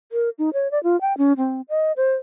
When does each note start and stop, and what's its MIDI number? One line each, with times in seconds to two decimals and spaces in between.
0.12 0.29 70
0.38 0.50 63
0.53 0.70 73
0.71 0.81 74
0.83 0.99 65
1.01 1.16 79
1.18 1.33 61
1.37 1.61 60
1.69 1.92 75
1.97 2.13 72